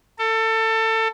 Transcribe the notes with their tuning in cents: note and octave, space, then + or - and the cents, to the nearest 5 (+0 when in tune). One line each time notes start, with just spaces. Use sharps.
A4 +25